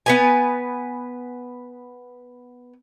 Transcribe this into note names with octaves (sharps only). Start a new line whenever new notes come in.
B3 B4 G#5